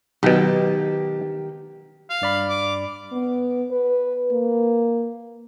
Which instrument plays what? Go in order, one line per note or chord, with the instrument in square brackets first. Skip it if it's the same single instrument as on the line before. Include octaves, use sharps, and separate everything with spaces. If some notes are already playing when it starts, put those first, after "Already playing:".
[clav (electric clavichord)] B1 B2 [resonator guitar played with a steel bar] D#3 G4
[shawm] F5
[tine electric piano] G2 D5 B5
[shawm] D6
[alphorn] B3
B4
A#3